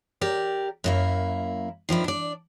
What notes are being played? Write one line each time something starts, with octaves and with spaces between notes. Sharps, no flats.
G4 A#4 D5
F#2 A#3 E4
D#3 F3 D4 E4
D4 D5